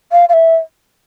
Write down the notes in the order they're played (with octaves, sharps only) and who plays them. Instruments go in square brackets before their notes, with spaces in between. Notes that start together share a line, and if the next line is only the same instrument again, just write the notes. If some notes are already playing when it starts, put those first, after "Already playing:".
[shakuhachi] F5
F5
E5